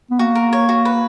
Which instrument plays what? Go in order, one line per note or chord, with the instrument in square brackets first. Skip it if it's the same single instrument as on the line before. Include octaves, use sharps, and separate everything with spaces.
[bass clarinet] B3
[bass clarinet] A#3 [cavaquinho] F#4
[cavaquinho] A#4
C#5
F#4
B4